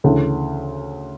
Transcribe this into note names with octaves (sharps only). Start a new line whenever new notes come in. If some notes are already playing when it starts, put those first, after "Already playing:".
D2 C#3 E3